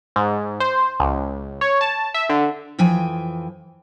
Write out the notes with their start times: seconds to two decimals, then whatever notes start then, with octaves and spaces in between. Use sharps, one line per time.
0.16 G#2
0.60 C5
1.00 C#2
1.61 C#5
1.81 A5
2.14 E5
2.29 D3
2.79 F2 E3 F3 G5 G#5